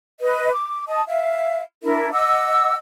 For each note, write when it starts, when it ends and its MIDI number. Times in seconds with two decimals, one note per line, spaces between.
0.20 0.51 71
0.20 0.51 75
0.52 0.84 86
0.88 1.02 75
0.88 1.02 81
0.88 1.02 87
1.06 1.62 76
1.06 1.62 77
1.83 2.10 62
1.83 2.10 64
1.83 2.10 70
1.83 2.10 76
2.12 2.75 75
2.12 2.75 78
2.12 2.75 86
2.12 2.75 88